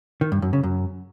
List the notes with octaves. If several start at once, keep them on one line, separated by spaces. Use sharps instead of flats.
D#3
G2
F#2
C#3
F#2